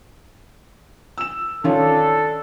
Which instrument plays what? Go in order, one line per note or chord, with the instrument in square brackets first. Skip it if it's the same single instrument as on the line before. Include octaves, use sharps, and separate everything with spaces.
[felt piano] E6 E7
[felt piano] D#3 C#4 F4 [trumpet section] D4 A4